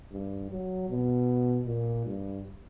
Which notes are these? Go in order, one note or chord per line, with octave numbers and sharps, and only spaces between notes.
G2
F#3
B2
A#2
G2